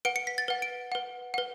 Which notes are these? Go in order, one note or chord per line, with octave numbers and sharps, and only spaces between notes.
B4 F#5 D7
C#7
B6
A6
B4 F#5
D7
B4 F#5
B4 F#5